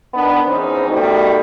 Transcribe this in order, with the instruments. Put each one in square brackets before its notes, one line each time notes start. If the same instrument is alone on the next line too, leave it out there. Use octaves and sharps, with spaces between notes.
[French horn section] D#3 B3 D4
E2 E3 C4 C#4 D#4 C5
D#3 G3 A3 B3 D#4 F#4